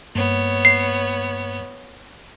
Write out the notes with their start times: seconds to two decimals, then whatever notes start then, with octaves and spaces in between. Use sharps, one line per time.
0.15 G2 A#3 B3 C#5
0.65 C7